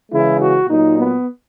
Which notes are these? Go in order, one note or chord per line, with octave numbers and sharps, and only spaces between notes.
C#3 E3 G#3 E4
F#4
A#2 F#3 D#4
B3